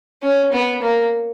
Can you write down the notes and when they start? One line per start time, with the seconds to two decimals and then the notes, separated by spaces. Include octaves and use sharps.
0.23 C#4
0.52 B3
0.82 A#3